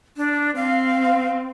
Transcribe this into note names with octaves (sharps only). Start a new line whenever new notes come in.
D4
C4 F5